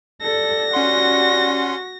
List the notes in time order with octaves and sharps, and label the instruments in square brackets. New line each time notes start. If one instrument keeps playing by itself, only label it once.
[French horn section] G4 D5 [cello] A4 [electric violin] A#6
[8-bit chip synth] C#4 F#5 C6 [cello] F#4